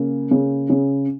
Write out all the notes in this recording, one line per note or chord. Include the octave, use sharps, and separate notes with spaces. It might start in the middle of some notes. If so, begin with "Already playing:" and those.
Already playing: C#3 A#3
C#3
C#3